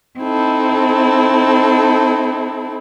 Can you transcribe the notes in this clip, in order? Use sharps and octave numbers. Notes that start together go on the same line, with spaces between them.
C4 D#4 E4 A4